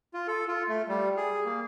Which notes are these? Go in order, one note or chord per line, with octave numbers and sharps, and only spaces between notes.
F4
A4
F4
A3
G3
G#4
A#3